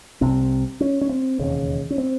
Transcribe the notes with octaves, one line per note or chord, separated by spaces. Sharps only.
C2 C3 C4
C#4
C#4
C4
E1 D#2 C#3
C#4
C4